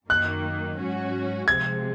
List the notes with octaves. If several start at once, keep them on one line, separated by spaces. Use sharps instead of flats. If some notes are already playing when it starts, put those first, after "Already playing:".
F#2 D#3 A#3 F#6
G#2 F#3 C#4 F#4
C3 F3 G#3 C4 G#6